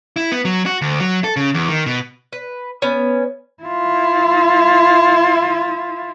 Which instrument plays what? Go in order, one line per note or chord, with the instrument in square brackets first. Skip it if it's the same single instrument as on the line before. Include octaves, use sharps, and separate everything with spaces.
[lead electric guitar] E4
B3
F#3
F#4
D2
F#3
A4
C#3
E2
D#3
B2
[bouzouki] B4
B3 C#4
[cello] E4 F4